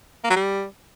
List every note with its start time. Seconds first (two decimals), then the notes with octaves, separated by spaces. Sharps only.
0.24 A#3
0.30 F#3
0.36 G3